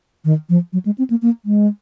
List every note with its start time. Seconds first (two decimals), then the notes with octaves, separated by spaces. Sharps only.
0.25 D#3
0.49 F3
0.73 F#3
0.86 G#3
0.98 C4
1.10 A#3
1.22 A#3
1.45 G#3